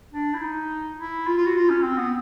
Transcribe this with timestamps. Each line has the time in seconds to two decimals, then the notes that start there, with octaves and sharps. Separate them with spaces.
0.13 D4
0.34 E4
0.41 D#4
0.99 E4
1.27 F4
1.37 F4
1.46 F#4
1.56 F4
1.70 C#4
1.83 C4
1.97 B3